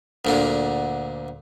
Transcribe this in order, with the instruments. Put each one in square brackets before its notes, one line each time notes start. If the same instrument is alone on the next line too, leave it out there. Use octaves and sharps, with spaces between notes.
[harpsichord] D2 A#2 D3